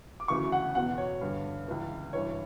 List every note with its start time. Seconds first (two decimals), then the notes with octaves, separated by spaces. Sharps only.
0.20 D6
0.28 D2 C#3 E3 C#6
0.52 F#5
0.75 E2 B2 F#5
0.98 C#5
1.21 G2 D3
1.67 C#2 C#3 E3
2.13 G2 E3 C#5